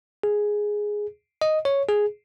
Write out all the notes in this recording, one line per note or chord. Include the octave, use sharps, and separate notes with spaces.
G#4
D#5
C#5
G#4